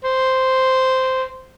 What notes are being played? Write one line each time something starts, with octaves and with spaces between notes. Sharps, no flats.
C5